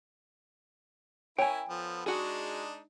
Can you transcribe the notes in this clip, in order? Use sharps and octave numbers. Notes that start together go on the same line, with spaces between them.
C#4 E4 A#4 C#5 G5 G#5
F3 B3 A4
G#3 D4 D#4 F#4 G#4